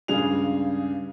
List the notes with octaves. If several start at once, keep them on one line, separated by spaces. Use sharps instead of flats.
C#2 G2 C#3 G#4 F5 F7